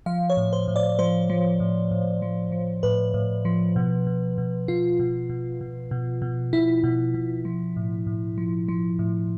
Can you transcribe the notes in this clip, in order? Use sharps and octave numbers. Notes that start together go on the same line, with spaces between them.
F3 F5
C#5
A2
C5
A2
D5
F3 C5
F3
A2
A2
F3
F3
A2 B4
A2
F3
B2
B2
B2
B2 F4
B2
B2
B2
B2
B2
B2 E4
B2
B2
F3
A2
A2
F3
F3
A2